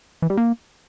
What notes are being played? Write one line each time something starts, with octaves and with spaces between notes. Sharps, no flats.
E3
G3
A#3